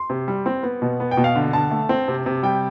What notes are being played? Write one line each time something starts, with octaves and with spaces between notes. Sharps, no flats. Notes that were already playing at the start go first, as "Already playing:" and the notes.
Already playing: C6
C3
G3
C4
B3
B2
B3
G5
B2
F5
D3
D3 A5
A3
C4
C3
C3
G3 G5